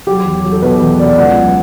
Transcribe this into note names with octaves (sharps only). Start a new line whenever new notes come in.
F#3 G4
E2
F#3
A4
B2 B4
E2
B2 D5
C#2 F#5
F#3